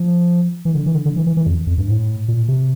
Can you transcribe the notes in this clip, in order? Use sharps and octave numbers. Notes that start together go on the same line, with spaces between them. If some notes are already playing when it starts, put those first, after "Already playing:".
Already playing: F3
E3
D3
E3
D3
D3
E3
E3
E3
F2
F2
G2
A2
A#2
C3